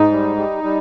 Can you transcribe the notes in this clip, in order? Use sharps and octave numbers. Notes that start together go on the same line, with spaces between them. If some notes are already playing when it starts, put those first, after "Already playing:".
Already playing: G#2 D#4
G3
G3
G3